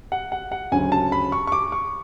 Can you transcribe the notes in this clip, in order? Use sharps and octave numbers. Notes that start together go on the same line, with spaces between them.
F#5
F#5
F#5
D2 C#3 F#3 C#4 G#5
A5
B5
C#6
C#6
D6
C#6